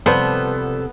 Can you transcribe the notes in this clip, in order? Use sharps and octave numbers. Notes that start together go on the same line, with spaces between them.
C3 F3 G3 B3 A4 C5